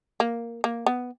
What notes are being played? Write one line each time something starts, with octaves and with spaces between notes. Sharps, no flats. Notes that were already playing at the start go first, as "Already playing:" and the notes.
A#3
A#3
B3